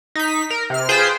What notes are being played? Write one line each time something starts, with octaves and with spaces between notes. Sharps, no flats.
D#4 B6
A#4
C3 F6
F4 G#4 B4 C5 G5